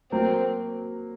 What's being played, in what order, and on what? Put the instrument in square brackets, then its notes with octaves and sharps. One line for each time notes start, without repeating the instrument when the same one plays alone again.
[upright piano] F#3 A#3 [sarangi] C4